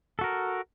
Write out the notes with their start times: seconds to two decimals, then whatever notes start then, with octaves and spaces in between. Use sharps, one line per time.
0.19 A4
0.21 F#4
0.24 A#4